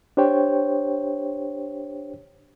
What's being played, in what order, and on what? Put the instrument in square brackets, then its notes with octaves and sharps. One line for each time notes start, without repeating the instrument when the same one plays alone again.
[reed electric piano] D4 G4 C5 C#5 G5